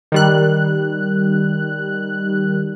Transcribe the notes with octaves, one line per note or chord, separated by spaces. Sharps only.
D#3 G3 F#6